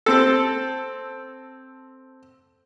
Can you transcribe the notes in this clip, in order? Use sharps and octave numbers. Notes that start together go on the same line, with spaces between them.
C4 A4